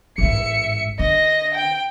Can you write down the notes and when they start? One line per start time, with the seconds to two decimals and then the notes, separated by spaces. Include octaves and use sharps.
0.18 A1 G#2 E5 C#7
0.99 D3 D#5 A#6
1.55 G5